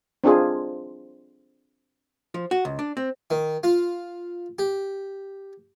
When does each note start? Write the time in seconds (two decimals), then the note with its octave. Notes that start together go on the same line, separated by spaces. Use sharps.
0.24 C4 D4 F4 G#4 C5
2.34 F3
2.51 F#4
2.65 C#2
2.79 D4
2.97 C4
3.30 D#3
3.63 F4
4.59 G4